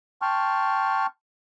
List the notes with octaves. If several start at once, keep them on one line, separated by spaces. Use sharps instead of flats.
G5 A5 C6 C#6 F6